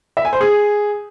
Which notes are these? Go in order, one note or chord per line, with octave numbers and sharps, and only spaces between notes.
E5
G#5
C5
G#4